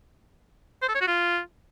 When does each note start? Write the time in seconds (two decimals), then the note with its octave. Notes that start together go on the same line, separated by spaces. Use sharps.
0.82 C5
0.88 A4
0.95 C#5
1.01 F#4
1.07 F4